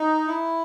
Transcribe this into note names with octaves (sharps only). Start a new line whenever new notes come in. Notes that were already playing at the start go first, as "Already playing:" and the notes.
Already playing: D#4
E4